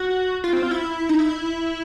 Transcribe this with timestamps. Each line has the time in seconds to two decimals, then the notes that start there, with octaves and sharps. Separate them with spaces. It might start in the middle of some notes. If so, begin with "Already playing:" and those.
Already playing: F#4
0.44 F4
0.53 C4
0.63 F4
0.71 E4
1.09 D#4
1.19 E4